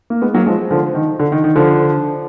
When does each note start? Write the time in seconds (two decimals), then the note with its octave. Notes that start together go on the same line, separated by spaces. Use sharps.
0.10 A#3
0.22 G#3 B3
0.34 F#3 A#3
0.46 F3 G#3
0.70 D3 F3
0.94 D#3
1.20 D3
1.32 D#3
1.44 D#3
1.56 D3 F3